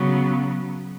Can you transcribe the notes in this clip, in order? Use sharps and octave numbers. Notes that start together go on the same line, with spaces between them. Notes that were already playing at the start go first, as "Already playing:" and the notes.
Already playing: C#3 F#3 B3